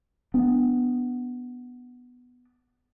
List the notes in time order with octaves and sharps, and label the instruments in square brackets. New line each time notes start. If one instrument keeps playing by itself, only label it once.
[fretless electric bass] B3 D4